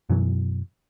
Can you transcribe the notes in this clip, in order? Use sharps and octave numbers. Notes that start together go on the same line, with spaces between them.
F#2 B2 E3 F#3